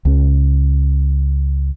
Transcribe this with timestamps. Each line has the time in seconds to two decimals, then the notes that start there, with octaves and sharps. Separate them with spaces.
0.05 C#2 C#4